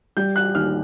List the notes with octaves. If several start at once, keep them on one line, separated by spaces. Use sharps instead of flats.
G3 G6
F#6
D#2 F6